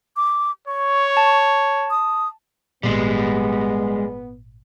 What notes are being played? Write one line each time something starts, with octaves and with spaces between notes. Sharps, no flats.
D6
C#5 C#6
A5
D#6
G#1 A#2 G3 G#3 B3